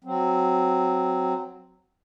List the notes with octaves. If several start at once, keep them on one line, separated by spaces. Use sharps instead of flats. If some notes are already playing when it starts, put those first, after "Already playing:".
F#3 C4